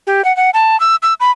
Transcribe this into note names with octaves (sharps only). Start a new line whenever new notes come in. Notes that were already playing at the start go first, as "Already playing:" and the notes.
G4
F#5
F#5
A5
E6
E6
B5